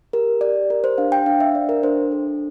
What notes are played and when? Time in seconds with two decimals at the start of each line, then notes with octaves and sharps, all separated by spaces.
0.13 G4 A#4
0.41 G4 D5
0.70 G4 A#4
0.84 C5
0.98 D4 F5
1.12 G5
1.26 D4 F5
1.40 E5
1.55 D4 D5
1.69 A#4
1.83 D4 C5
2.12 A4